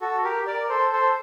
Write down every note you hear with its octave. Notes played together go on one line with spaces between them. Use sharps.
F#4 A4
G4 A#4
A#4 D5
A#4
A4 C5
A4 C5